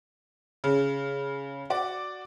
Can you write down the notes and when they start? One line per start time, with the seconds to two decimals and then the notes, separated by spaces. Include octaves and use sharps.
0.64 C#3
1.70 F#4 D5